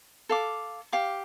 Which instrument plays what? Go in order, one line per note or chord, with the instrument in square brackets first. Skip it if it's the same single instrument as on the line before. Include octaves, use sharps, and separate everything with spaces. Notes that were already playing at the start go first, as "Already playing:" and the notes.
[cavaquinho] A4 F5 D6
G4 F5 D6